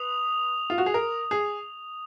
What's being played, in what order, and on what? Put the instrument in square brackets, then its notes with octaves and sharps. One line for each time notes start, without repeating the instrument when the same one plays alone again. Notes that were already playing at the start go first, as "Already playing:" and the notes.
Already playing: [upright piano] B4 [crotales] D#6 F7
[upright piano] F4
F#4
G#4
A#4
G#4